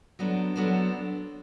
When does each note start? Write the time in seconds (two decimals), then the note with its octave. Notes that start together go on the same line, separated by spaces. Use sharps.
0.19 F#3 B3 D4 A4 C5
0.56 F#3 B3 D4 A4 C5